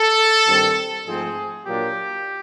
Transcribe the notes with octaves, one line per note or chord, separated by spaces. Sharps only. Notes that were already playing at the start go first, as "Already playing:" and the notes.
Already playing: A4
G2 D#3 G3 C4
G#2 F3 A3 C4 G#4
A#2 F#3 A#3 D4 G4